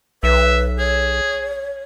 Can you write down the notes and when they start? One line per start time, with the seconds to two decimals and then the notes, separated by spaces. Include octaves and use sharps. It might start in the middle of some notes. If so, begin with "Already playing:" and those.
0.23 B1 B4 E5
0.78 G#4 C#5